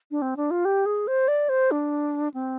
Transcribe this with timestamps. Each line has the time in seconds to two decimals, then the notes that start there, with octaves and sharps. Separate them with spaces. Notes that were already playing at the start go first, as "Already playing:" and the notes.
0.11 D4
0.22 C4
0.37 D4
0.51 F4
0.65 G4
0.86 G#4
1.07 C5
1.28 D5
1.49 C5
1.71 D4
2.34 C4